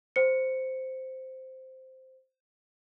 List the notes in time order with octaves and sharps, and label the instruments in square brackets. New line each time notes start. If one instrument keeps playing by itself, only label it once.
[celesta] C5 C#7